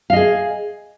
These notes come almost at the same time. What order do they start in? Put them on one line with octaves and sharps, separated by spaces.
F5 D#5 G#4